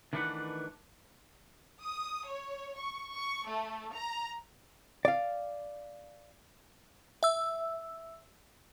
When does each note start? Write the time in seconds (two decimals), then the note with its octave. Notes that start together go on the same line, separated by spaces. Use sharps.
0.13 D#3 E3 A3 D4 B4 F#5
1.82 D#6
2.29 C#5
2.78 C#6
3.14 C#6
3.48 A3
3.94 A#5
5.05 D5 F5
7.23 E5 E6